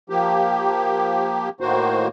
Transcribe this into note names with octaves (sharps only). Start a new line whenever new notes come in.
F3 A#3 G4
A2 D#3 A#3 F#4 C5